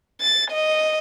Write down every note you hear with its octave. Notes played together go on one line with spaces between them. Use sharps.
A6
D#5